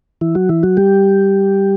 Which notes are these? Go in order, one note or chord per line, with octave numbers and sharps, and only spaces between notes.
E3 E4
F#3 F#4
E3 E4
F#3 F#4
G3 G4